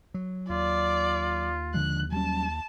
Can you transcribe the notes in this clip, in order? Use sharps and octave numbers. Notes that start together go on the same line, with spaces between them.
F#3
D#2 F4 D5
D3 F3 G#3 F#6
F#3 G3 C#4 A5